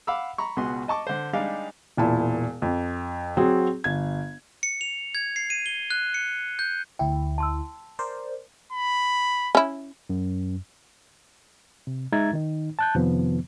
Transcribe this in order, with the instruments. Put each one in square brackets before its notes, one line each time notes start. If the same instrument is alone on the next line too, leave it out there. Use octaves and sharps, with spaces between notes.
[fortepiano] F5 F#5 B5 D6 E6
A#5 B5 C#6
C#2 B2 B3 F#4 G#4 C6
D#5 A5 C#6 D6
D3 C5
G3 G#3 D4 D#4 G4 F5
[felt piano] E1 A#2 E4 A5
F2
F#3 C4 F#4 G#4
G1 G#6
[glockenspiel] C#7
F7
G#6
C7
D#7
G7
F#6
C#7
G6
[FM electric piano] D2 E4 [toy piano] G5
[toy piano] A5 C6 E6
[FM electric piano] A#4 C5 D5
[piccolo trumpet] B5
[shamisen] C#4 E4
[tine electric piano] F#2
[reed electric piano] C3
G#3 D#4 E5 A#5 G#6 A6
D#3 D#4
A5 F#6 G6
F2 C3 D#3 F3 B3